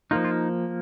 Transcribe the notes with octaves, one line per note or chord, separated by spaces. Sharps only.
F3 A#3 D#4 F4
F4